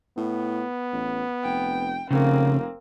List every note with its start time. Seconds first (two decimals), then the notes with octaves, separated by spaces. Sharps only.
0.17 A2 B3
0.92 A1
1.44 F1 G5
2.11 F1 C#3 A#3 C4